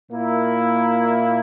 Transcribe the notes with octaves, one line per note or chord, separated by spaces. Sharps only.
A#2 A#3 E4